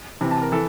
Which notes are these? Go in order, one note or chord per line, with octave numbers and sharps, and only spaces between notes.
C3 E3
A5
A#4
E3 A4